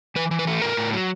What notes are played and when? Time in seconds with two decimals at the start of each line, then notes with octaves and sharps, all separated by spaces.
0.16 E3 B4
0.31 E3
0.39 B4
0.47 A3
0.62 A2 A#4
0.77 A2
0.93 F#3